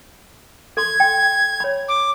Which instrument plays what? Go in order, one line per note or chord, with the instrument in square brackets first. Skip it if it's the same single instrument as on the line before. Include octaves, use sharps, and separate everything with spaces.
[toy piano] A4 C6 [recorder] G#6
[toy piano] G5
C#5 B5
[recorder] D6